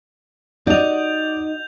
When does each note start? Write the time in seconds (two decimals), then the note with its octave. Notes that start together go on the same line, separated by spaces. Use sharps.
0.67 D#4 F#4 D5 D#5 G6 F7